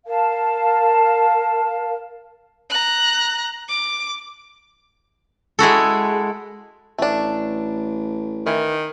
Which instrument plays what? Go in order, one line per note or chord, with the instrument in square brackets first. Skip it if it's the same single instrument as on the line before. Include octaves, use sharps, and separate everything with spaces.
[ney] A#4 [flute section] F5 A5
[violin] A#5 F#6
D6
[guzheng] G#3 E4 F#4 A4
[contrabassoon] A1 [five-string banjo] A3 D4
[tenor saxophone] D#3 [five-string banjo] E3